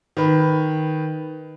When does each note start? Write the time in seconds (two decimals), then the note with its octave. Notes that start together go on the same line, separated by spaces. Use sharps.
0.17 D#3 B4